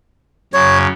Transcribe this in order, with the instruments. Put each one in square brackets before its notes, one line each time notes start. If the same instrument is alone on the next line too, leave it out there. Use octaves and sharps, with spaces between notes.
[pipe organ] F#2 C#3 [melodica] C#5